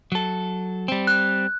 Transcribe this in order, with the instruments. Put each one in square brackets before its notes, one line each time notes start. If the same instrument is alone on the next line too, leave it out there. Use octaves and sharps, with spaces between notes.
[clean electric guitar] F#3 A4
G3 C4
[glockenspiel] F#6